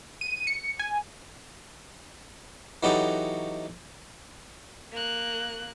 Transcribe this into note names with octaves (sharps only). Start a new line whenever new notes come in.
D#7
C#7
G#5
E3 F#3 B3 D#4 G4 A4
A#3 F#6